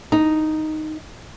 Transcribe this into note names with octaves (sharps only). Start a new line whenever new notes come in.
D#4